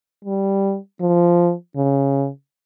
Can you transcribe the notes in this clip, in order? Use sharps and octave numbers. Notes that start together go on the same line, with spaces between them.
G3
F3
C#3